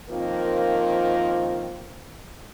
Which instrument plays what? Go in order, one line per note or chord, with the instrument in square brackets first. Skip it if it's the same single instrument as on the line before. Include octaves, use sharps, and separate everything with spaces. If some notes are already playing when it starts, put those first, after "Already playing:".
[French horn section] D#3 F3 A#3 C4 F4 A#4